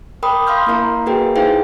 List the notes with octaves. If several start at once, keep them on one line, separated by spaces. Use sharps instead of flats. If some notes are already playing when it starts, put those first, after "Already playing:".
A#4 G5 B5 D6 D#6
F5 B5 C6 F6 G6
A#3 E4 A#4 F5 A#5
A#3 F#4 G#4 A#4 B4 G5
D#4 E4 G#4 C5 F5 G5